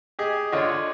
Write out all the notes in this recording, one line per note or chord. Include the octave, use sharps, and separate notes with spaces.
G4 G#4 D#5
D3 F4 C#5 D#5